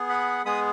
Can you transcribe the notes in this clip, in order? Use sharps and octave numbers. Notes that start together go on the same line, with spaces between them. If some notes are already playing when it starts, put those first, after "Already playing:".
Already playing: B3 G#4
F#5 B5
G#3 B3 G#4 B5 D#6